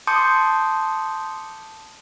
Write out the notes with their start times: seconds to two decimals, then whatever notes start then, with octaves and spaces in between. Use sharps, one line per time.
0.07 A5 C6 D6 D#6 G6 C#7